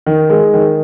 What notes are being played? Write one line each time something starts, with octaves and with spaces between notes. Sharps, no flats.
D#3
G#3
D#3